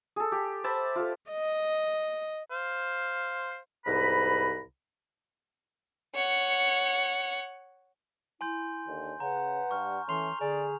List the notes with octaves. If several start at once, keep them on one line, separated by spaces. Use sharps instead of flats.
G#4 A4
G4
C5 E5 A5 B5
F4 A4
D#5
C5 F5
C2 G#2 B4 A#5 B5
C#5 F#5
E4 G#5 C6 G6
D#2 D3
C#3 B4 F#5 A#5
G2 C#6 F6
E3 A3 C#4 C6 F7
D3 G#4 D5 A#5